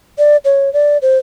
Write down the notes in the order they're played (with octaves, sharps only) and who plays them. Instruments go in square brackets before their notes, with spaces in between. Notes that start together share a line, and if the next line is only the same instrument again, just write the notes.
[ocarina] D5
C#5
D5
C5